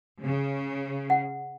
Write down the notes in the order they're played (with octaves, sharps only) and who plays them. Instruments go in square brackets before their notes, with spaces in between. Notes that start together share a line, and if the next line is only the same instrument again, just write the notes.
[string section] C#3
[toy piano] F#5